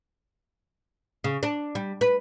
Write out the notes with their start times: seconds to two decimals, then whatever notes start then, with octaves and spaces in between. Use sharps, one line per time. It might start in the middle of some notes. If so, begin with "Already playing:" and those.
1.24 C#3
1.43 D4
1.75 G3
2.01 B4